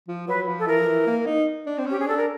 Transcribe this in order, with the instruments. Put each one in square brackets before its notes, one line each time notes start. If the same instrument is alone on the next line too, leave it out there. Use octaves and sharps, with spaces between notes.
[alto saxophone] F3
[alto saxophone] F#3 [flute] B4
[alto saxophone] F3
[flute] A4
[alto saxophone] E3 [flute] A#4
[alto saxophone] F3
E3
A#3
D#4
D4
C4
[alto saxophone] C#4 [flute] G4
[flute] G#4
[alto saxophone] D4 [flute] A4
[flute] A#4